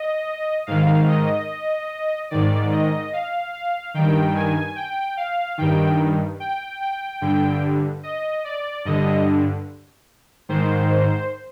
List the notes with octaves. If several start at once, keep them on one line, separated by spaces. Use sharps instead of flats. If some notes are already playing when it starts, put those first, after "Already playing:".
Already playing: D#5
G#2 D#3 F5
D#5
G#2 D#3 D5
D#5
F5
F5
G2 D#3 G5
G#5
G5
F5
G2 D#3 G5
G5
G5
G2 D3 G5
D#5
D5
G2 D3 D#5
G#2 D#3 C5